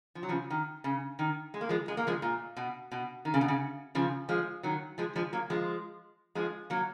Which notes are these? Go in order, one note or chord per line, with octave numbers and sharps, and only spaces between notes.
F3
F#3
C#3 F3
D#3
C#3
D#3
G#3
A#3
F3 G#3
G#3
A#3
F3 G#3
A#2
B2
B2
D#3
C#3
B2
C#3
C#3 F3
F3 G#3
D#3 F#3
F3 G#3
F3 G#3
F#3 A#3
F3 G#3
F3 G#3
F#3 A#3